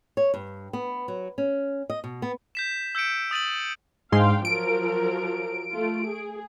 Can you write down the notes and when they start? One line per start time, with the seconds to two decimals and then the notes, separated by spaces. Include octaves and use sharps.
0.17 C#5
0.34 G2
0.73 B3
1.08 F#3
1.38 C#4
1.90 D#5
2.04 B2
2.22 B3
2.55 G6 B6 E7
2.95 E6 G6 B6 C#7 D7
3.31 D#6 A6 D#7 F#7
4.12 G#2 G#3 D4 F5 G5 C6
4.45 F3 F#3 A#4 D7
5.73 A3 F4
6.06 G#4